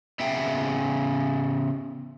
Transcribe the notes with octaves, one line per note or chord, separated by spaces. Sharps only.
C#3 B3 E5 G5